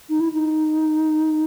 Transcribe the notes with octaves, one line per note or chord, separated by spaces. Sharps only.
D#4
E4
D#4